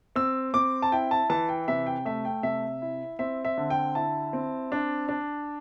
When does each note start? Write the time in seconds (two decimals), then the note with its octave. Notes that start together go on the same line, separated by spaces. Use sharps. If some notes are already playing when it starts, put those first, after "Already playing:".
0.16 C4 E6
0.54 C4 D6
0.82 A5
0.92 E4 G5
1.11 A5
1.30 E3 A5
1.49 G5
1.68 C3 E5
1.87 G5
2.06 A3 E5
2.25 G5
2.43 C3 E5
2.82 E4
3.19 C4 E5
3.45 E5
3.58 D3
3.70 G5
3.95 E4 A5
4.33 C4
4.72 D4
5.09 D4